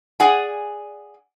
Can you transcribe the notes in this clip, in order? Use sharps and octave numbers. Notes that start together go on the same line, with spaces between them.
G#4 D5 F#5 G#5